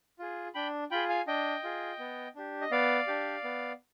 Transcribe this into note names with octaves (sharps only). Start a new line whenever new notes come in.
F4 G#4
D4 G5 B5
F4 G#4 G5 B5
F5 G#5
D4 D#5 G5
F4 G#4
B3
D4 G4
D#5
B3 D5 F5
D4 G4
B3